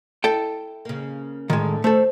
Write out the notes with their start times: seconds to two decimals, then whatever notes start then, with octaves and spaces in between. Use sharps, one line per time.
0.24 E4 A4 G5
0.85 C#3 A#3
1.50 A2 D3 D#3 G#3
1.84 A3 A4 C5